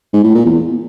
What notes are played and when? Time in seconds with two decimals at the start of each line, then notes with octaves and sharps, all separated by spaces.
0.13 G#2
0.24 A2
0.35 A#2
0.46 E2